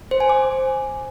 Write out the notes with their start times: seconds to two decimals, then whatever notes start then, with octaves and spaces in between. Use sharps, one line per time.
0.11 C5
0.20 G#5
0.29 D6